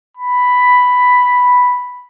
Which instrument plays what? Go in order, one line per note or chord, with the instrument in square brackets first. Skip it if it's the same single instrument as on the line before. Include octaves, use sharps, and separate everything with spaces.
[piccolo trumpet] B5